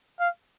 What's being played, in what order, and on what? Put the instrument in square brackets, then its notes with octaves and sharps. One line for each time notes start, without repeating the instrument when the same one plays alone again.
[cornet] F5